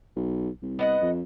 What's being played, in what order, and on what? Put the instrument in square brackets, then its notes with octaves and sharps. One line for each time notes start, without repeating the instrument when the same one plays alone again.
[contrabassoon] B1
C2
[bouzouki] B3 D#5 F#5
[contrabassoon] F2